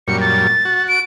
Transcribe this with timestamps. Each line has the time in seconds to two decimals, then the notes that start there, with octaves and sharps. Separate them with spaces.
0.08 F#2 A#2 G3 C#7
0.21 A6
0.65 F#4
0.88 D7